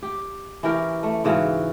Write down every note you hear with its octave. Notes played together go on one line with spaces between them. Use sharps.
G4
E3 C#4 G4 A#4
A3
G#2 C#3 E3 F#4